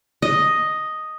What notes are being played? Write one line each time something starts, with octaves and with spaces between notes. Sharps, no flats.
D#5